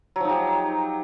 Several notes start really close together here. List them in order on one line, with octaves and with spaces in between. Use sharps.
F#3 F3 D#4 G4